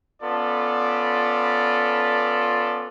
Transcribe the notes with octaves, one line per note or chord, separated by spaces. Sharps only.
B3 C#4 F4 A4 D5 B5